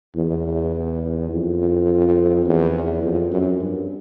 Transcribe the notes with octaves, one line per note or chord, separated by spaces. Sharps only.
E2
F2
E2
F2
F#2
G2